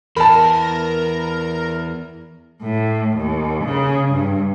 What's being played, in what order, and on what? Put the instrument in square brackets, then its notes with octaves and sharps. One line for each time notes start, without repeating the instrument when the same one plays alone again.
[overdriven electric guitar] E2 [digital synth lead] A#4 [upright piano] A5 B5
[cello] A2
D#2
C#3
G2